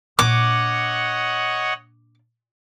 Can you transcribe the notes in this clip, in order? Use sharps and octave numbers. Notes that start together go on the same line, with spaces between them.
A#2 D4 C#5 D#5 F#5 D6